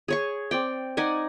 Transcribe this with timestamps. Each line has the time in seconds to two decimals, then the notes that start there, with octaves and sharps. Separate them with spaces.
0.08 G#4 C#5 C#6
0.51 C4 D5 G5
0.97 D#4 D5 F#5 G#5